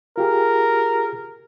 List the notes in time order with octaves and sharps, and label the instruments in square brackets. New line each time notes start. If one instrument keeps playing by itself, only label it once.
[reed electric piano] F4 G4 G#4 [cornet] A#4